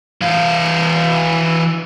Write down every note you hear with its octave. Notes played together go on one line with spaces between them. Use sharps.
E3 F5